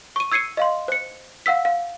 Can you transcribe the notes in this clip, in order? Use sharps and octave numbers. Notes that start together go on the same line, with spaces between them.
C#6 D#7
E6 G#6 C7 C#7 D#7
D#5 F5 C6
C5 C#7
F5 F#5 E6 B6
F5